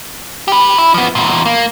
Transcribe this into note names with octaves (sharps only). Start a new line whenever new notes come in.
G4 B4
E4
F3 B3
E2 A#2
A#3